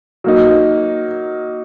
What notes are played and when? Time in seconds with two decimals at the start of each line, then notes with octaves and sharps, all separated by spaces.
0.24 F#3 A#3 D#4